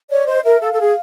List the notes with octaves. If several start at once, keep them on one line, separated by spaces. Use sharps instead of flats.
C#5 D5
C5 D#5
A#4 E5
A4 F5
A4
G#4